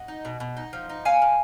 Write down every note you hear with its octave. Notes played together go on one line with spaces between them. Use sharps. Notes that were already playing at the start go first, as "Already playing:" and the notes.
Already playing: D#5 F#5
D#4
B2
B2
D#4
F3
D#4
B3 F5 G#5
F3